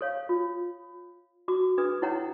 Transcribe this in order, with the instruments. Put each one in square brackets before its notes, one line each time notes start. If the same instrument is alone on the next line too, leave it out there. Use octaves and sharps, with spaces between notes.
[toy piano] A4 C#5 F5
F4
F#4 D6
D4 G#4 B4 D#6
D#4 E4 C#5 F#5 G5 A#5